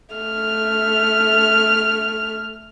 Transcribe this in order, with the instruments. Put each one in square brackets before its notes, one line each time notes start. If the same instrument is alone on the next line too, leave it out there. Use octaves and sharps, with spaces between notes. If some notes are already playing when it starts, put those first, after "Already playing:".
[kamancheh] A3 F6